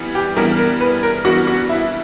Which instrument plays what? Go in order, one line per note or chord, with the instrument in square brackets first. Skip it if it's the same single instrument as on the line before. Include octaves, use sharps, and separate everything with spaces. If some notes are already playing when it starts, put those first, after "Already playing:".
Already playing: [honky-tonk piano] E3 G3 B3
[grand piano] G4
[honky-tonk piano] E3 G3 B3 D4 [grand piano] A#4
[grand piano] A#4
B4
A#4
[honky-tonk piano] E3 G3 B3 D4 [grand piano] F#4
[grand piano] F#4
E4